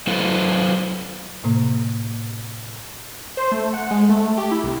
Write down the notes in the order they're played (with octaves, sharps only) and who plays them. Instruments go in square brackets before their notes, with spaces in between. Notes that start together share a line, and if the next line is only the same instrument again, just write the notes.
[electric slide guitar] F#3 E4 A4 B4 C5 F5
[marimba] A2 C3 A#3
[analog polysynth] C5
A3
F#5
G#3
A3
G4
E4
C2